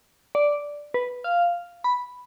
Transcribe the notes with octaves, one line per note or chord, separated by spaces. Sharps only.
D5
B4
F5
B5